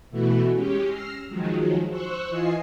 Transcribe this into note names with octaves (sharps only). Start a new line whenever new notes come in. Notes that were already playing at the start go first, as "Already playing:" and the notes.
B2 E3 A3 E4 F#4
G#3 C#4 G4
E6 F6 A#6 C7
D#3 F3 F#3 G#3
C5 C#6 E6 F#6
E3 F4 D#5 G#5 C7